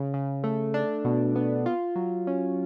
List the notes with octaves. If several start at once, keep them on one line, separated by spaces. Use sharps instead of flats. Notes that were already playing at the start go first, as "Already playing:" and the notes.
Already playing: C#3
C#3
A3
D4
B2
B3
F4
F#3
C#4